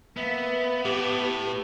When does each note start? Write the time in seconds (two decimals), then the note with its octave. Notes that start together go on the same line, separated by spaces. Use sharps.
0.17 A#3 B3 E5
0.85 A2 G4 E5